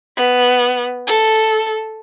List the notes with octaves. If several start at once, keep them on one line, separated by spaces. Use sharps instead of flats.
B3
A4